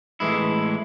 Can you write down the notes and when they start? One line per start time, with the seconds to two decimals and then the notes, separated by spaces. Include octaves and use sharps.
0.20 A2 E3 G#3 E4